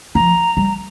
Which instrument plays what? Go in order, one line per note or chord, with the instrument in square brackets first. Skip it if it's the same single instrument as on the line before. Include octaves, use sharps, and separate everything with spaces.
[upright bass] F3 [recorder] A#5
[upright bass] G3